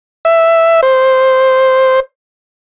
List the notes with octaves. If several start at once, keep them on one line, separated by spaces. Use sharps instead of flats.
E5
C5